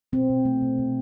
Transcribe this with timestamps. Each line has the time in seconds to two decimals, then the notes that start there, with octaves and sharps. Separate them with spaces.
0.13 B2 C4
0.30 B2
0.45 A3
0.62 B2
0.79 B2